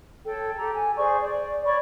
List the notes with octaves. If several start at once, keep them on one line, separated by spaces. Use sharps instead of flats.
A4 C#5 G5
G4 A4 A#5
G#5
G#4 C5 D5 C#6
D5
C#5 D5 B5 C#6